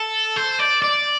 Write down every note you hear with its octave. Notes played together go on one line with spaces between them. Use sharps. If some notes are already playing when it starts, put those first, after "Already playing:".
Already playing: A4
C5
D5
D5